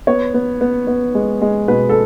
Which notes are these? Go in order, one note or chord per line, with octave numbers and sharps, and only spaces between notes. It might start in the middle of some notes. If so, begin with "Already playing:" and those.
B3 C#5
B3
B3
B3
G#3
G#3
B2 B4
A4